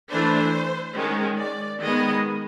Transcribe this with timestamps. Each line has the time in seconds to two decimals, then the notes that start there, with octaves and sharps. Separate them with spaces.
0.09 E3 A3 D4 C5
0.95 D#3 G#3 C#4
1.38 D5
1.80 D#3 G#3 B3 D#5